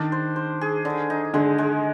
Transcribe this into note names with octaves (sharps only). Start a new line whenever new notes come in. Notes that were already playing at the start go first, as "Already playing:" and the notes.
Already playing: D#3 D4
C5
C5
G#4
D3
D#4
D3 G#3
G#3